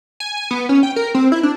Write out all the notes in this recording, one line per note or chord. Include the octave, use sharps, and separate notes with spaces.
G#5
G#5
B3
C#4
G5
A#4
C4
E4
D4